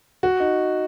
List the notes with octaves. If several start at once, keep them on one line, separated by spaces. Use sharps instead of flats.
F#4
D#4